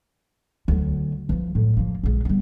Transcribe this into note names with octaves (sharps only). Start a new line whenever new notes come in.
D2 F#3
E3 F3
A2 F#3
F3 A#3
A#1 G#3
G3 B3